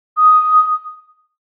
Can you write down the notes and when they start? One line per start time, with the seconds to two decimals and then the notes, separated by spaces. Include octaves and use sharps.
0.17 D#6